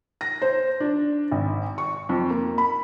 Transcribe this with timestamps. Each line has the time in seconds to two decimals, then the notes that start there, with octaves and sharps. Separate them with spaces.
0.21 A#6
0.42 C5
0.80 D4
1.31 G#1
1.78 C#6
2.09 F2
2.30 A#3
2.58 B5